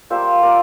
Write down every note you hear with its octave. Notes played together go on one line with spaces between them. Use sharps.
G3 A#3 F4 C5 E5
A#4 D5